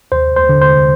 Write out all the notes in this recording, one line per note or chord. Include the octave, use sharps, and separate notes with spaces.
D#2 C5
C5
D3
C5